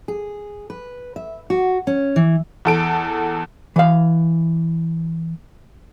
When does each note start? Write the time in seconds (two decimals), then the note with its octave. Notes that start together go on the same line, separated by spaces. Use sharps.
0.08 G#4
0.70 B4
1.16 E5
1.50 F#4
1.87 C#4
2.16 E3
2.65 E2 A4 D7
3.76 E3 F5